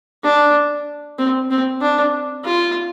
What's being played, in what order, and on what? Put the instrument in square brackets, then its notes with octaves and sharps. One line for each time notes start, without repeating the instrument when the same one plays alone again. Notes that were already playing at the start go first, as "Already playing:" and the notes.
[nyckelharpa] D4
C4
C4
D4
F4